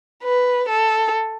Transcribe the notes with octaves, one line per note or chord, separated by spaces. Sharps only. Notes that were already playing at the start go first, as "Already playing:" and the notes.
B4
A4